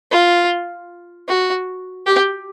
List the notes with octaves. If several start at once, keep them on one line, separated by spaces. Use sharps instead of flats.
F4
F#4
G4